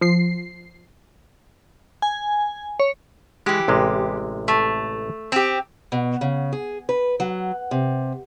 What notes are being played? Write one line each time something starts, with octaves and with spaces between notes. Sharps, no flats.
F3 C7
G#5
C#5
E3 G#3 G4
A1 C3 G#3
A3
C4 G4
B2
C#3
G#4
B4
F#3
C3